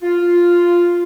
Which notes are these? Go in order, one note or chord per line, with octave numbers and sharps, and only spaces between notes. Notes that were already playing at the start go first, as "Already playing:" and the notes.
F4